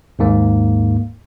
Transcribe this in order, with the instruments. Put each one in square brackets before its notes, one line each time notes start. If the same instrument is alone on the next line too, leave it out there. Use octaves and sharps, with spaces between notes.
[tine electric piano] D#2 G#2 A#3